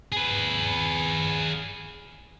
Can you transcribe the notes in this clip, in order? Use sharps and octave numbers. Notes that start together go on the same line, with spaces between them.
G#4 B4